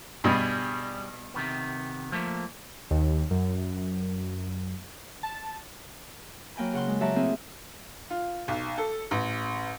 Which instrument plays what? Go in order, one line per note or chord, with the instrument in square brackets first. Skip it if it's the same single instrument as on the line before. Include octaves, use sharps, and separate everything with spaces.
[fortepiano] G2 B2 [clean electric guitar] G3 G#4
[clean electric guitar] C3 D#3 B3
F3 A3 A#3
[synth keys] D#2
F#2
A5
[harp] F#3 A#3 G5 G#5 B5
C#3 F#5 C6
G#3
F#3 G4 E5 F#5 A5 A#5
A3 A#3 C4 E4 G#4
[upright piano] F4
B1
A4
A1